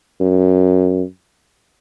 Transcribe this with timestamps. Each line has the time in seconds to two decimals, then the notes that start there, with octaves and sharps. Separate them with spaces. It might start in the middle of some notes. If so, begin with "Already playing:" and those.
0.20 F#2